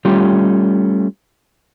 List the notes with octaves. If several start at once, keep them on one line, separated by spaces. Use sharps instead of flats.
G3 A3 C#4 F4 G4